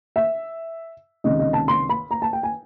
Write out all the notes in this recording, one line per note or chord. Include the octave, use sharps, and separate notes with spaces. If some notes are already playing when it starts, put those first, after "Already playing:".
E5
C#2 C3 D#3 D#5
D#5
A5
C6
B5
A#5
A5
G5
G#5